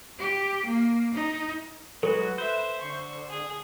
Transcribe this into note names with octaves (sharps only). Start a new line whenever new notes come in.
G4
A#3
D#4
F#3 G#3 F#4 A4 B4
C5 E5
D3 C#6
G#4